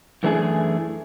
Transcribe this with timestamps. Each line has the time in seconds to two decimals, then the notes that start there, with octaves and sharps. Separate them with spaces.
0.23 F#2 E3 A3 D4 G#4